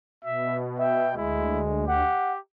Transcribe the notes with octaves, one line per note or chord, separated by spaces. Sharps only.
B2 E5
E5 G5
D2 G#3 E4
G4 F#5